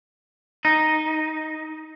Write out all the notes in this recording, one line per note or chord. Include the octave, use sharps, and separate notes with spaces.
D#4